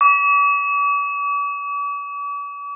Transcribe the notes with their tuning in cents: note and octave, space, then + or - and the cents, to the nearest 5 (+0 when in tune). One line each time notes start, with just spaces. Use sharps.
D6 -45